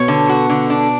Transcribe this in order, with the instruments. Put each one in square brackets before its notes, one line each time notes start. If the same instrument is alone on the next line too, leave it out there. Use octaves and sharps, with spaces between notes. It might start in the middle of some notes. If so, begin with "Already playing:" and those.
Already playing: [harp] B2 [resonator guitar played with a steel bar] C#5
[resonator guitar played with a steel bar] D3
F#4
D3
D4